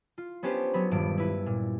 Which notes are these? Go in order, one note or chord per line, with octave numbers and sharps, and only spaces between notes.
F4
B3 C#4 D4 G4 B4 C5
F#3 B3 B5
D#1 G2 G3 D7
E4 B4
A#2